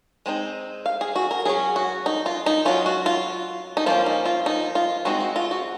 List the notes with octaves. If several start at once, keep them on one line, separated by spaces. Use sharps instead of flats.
G#3 C4 D#4
F5
G#4
F#4
A#4
F#3 C#4 G#4
F#4
D#4
F4
D#4
F#3 C#4 F4
F#4
F4
D#4
F3 A#3 C#4 F4
D#4
F4
D#4
F4
G#3 C4 D#4 F#4
F#4
F4
F#4